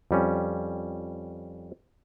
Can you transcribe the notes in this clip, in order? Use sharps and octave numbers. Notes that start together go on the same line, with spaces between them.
F2 G3 C#4